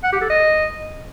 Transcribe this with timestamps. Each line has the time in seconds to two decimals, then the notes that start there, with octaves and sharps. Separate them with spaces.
0.04 F#5
0.12 G4
0.21 A4
0.30 D#5